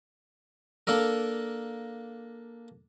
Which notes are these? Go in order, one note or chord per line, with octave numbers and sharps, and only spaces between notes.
A#3 D4 A4 A#4